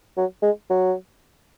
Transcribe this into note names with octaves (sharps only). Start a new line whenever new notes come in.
F#3
G#3
F#3